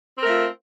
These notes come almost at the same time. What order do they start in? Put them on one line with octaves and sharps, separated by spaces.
C4 A#4 A3 F4